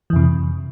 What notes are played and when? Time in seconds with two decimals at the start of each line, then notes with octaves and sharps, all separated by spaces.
0.10 E3
0.13 F2
0.16 C3